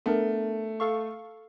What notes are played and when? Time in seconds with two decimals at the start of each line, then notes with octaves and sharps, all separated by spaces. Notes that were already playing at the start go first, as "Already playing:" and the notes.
0.06 A3 B3 D4 A#4
0.80 A4 F5 C#6